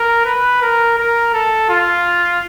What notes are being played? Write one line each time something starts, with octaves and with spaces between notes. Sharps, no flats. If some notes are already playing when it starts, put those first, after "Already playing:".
Already playing: A#4
B4
A#4
A#4
A4
F4